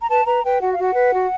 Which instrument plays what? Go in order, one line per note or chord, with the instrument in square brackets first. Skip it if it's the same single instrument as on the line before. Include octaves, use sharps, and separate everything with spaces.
[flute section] A#5
B4 A5
B4 A#5
B4 G5
F#4 F#5
F5
F#4 F#5
B4
F#4